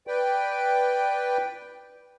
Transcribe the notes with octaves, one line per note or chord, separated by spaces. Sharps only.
B4 D5 G5